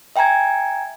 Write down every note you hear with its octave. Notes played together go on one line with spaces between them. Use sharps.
E5 G5 G#5 A#5 G#6